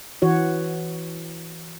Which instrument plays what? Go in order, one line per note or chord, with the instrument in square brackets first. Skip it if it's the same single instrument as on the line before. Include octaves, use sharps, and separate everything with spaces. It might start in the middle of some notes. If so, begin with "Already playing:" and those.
[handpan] E3 F#4 C#5